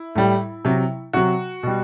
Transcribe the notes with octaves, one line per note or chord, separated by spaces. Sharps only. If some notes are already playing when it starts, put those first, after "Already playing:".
Already playing: E4
A2 G3
C3 F#3
C3 F#3 F#4
B2 G3